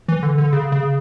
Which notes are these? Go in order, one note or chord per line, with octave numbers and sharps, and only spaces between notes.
E3
D3
D3
C#3
C#3